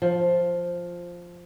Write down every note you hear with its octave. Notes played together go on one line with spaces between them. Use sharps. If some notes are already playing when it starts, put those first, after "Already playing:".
F3